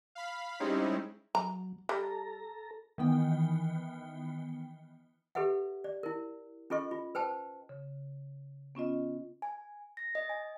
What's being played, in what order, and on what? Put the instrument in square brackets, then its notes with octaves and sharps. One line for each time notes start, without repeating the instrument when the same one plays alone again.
[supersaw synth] F5 B5
G3 G#3 C4 C#4 D#4 E4
[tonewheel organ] F#3 [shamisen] A#5
[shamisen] G3 [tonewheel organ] A4 A#5
[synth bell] D#3 E3 B3 G5
[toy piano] G4 A4 B4 E5 F#5
D5
E4 A#4
C#4 F4 A4 D#5 C#6
F4
B4 C5 G5 A5
[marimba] C#3
B3 C#4 F4 D#5
[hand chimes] G#5
A#6
D#5
G#5